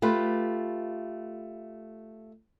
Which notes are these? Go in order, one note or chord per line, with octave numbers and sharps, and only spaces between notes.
A3 F4 G4 B4